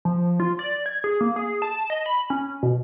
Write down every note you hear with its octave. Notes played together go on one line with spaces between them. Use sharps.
F3
F4
D5
G#6
G#4
A#3
G#4
A5
D#5
B5
C#4
B2